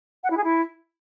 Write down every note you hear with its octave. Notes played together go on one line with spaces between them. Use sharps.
F#5
E4
G#4
E4